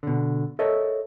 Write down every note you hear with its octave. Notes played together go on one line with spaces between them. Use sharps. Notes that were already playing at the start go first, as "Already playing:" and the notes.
B2 D3
A4 A#4 C#5 D#5 E5